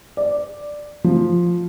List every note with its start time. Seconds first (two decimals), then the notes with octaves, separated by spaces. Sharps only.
0.17 D5
1.04 F3